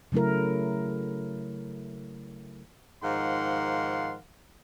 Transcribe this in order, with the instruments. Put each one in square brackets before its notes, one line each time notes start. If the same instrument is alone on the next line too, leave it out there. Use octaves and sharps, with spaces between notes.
[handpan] C#3 F#3 A3 E4 A#4
[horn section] G#2 D#3 F3 F5 F#5 C6